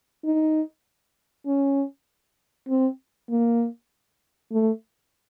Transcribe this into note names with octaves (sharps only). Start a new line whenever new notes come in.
D#4
C#4
C4
A#3
A3